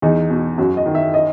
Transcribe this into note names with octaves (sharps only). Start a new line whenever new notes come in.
E2 D#4
B2
F#2 F#4
D#5
D#3
E5
D#5